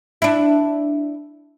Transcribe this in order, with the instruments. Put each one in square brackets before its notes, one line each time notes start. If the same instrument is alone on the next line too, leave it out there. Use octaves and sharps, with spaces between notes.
[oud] D4 E4